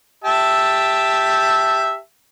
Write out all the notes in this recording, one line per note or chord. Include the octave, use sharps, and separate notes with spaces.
G4 E5 A5